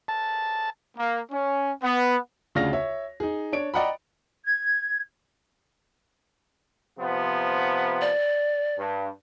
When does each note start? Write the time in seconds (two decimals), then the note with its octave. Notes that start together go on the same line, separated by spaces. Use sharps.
0.08 A5
0.98 A#3
1.32 C#4
1.83 B3
2.55 D2 C#3 D4 F4 F6 A#6
2.73 C#5 E5
3.20 D#4 G#4
3.52 D4 C#5 D7
3.74 D5 D#5 F#5 G5 A#5 B5
4.44 G#6
6.99 C3 F3 B3
8.01 D5
8.78 G2